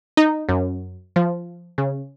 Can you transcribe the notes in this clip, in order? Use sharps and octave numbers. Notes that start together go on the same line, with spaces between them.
D#4
F#2
F3
C#3